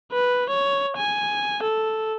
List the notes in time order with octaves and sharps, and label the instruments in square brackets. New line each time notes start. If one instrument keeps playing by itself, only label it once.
[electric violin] B4
C#5
G#5
A4